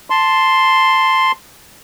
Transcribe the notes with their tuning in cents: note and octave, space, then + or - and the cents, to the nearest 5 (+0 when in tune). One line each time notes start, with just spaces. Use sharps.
A5 +0 C6 +0